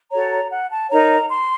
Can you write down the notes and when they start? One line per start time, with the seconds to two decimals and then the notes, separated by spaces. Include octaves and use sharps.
0.11 F#4 A4 C#5 A#5
0.31 A#5
0.51 F#5
0.70 A5
0.90 D#4 A#4 C#5 A#5
1.29 C6